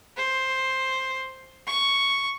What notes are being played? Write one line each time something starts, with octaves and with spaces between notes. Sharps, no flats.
C5
C#6